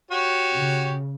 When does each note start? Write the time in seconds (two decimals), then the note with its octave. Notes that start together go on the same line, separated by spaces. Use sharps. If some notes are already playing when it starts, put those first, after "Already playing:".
0.11 F#4 G4 C#5
0.53 C#3